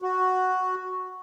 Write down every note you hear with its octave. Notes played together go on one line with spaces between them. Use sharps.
F#4